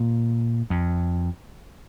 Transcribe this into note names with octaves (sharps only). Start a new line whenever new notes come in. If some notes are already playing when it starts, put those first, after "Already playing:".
Already playing: A#2
F2